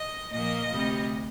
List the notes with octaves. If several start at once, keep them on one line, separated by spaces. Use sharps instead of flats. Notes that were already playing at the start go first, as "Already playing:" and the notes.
Already playing: D#5
A#2 F3 A#3 D#5
D2 C3 G3